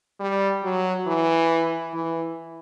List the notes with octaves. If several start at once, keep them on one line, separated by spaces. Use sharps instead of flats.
G3
F#3
E3
E3